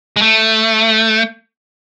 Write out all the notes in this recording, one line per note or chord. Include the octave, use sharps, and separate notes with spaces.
G#3
A3